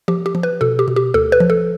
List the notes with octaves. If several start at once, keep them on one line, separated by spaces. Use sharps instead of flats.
F3 G4
G4
F3
B4
B2 A4
G4
B2
G4
D2 A4
B4
F3
A4